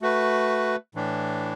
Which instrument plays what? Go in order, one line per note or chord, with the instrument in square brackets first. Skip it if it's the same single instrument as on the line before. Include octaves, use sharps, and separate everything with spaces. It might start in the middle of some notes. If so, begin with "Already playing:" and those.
[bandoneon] A3 F#4 B4
A2 E3 D4